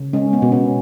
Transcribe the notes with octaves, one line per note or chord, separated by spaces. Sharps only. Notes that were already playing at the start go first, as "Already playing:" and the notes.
Already playing: C#3
G#3 C#4
B3
B2
C#4